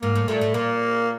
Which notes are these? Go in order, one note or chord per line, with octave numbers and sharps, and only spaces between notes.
G#2 A#3
A2
A#2 A3
A2
A#2 A#3